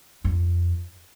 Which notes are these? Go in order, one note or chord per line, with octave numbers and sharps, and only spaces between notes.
F2